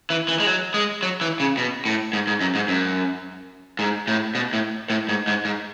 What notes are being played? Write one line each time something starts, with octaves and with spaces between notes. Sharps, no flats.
E3
E3
G#3
F#3
G#3
F#3
E3
C#3
B2
A2
G#2
G#2
F#2
G#2
F#2
G#2
A2
B2
A2
A2
G#2
G#2
G#2